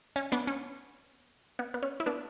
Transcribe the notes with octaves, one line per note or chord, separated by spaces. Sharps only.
C#4
B3 D4
C#4
B3
B3
C#4
E4
B3 D4